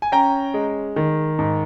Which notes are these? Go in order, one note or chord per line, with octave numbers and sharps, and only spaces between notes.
G#5
C#4 G5 A#5
G#3
D#3
G#2